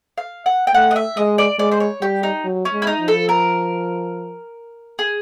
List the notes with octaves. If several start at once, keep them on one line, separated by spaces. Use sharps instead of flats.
F5
F#5
G5
A3 F#5
D#5
E5
G#3 D#5
D5
G#3 D5
C5
C#5
G3 G4
D#4
F#3
C#4
G#3
E4
D#4
F3
A4
A#4
G#4